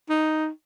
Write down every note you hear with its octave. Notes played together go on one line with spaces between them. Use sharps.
D#4